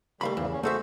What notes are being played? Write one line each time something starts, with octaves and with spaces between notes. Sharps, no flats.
D#3 G3 A3 F5 B5
E2 G#2 C#3 E3
C#4
A3 F#4 G#4 A4 C5 E5